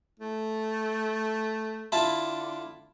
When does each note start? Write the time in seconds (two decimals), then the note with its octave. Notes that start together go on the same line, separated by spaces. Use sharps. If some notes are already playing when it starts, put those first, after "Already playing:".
0.19 A3
1.92 D3 E4 F4 A5